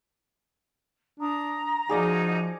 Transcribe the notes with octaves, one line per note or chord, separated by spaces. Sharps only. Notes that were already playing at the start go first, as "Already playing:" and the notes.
D4 A#5 D#6
F3 D#4 F4 F#4 G#4 D5 D#5